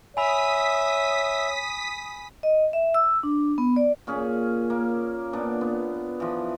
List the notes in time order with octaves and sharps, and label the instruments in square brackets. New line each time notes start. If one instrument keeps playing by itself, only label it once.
[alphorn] C#5 [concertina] E5 [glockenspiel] G#5 B5 [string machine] D#6 B6
[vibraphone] D#5
E5
E6
D4
B3
D5
[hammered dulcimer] A#2 C#4 G#4
A#3
A#2 B3 D4
B3
E3 F3